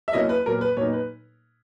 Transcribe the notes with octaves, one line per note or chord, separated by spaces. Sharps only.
E5
B2 F#3 A#3 C#4 E4 D#5
B4
A#2 F#3 B3 A#4
B4
A#2 F#3 B3 D#4 C#5
B4